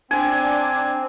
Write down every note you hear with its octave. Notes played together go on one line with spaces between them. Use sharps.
C4 D4 G#5